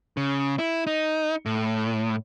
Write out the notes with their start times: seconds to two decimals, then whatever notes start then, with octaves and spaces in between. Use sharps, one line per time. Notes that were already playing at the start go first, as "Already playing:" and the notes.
0.17 C#3
0.59 E4
0.87 D#4
1.46 A2